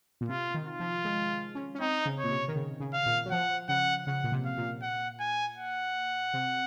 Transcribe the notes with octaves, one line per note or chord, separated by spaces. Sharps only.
A#2
C3 F4
D#3
F4
F3
G#3
C#4
C#4
C4 D#4
C#3
C#5
A#2
C3
D#3
C#3
C#3
F5
A#2
F#3
F3 F#5
C#3 F#5
C#3 F#5
A#2
C3
F5
A#2
F#5
G#5
F#5
C3